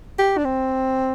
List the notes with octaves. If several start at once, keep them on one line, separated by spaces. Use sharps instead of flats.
G4
D4
C4